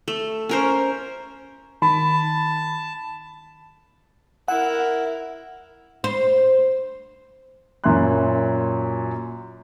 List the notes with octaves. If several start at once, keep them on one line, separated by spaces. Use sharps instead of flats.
A3
C#4 A#4 C5
D#3 A5 B5
E4 A#4 F#5
C5
F#2 A#2 E4 E5 C6 F#6